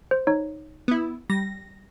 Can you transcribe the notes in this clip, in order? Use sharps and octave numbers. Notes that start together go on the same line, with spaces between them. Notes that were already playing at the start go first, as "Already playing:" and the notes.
C5
D#4 C#5
B3 E4
G3 A#6